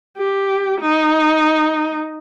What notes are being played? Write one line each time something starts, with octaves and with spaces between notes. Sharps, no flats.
G4
D#4